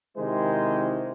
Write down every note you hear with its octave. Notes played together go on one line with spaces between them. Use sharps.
C3 D#3 G#3 E4 C5